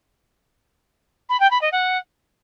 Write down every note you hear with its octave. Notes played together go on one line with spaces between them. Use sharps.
B5
G5
B5
D#5
F#5